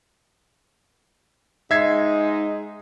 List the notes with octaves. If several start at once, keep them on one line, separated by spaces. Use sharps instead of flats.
G#2 G#3 D#4 E5 G#6 C7